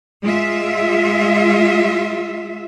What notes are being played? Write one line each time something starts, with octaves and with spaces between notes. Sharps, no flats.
G#3 F4 E5